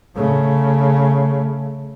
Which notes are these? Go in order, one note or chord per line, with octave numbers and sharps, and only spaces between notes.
C#3 A3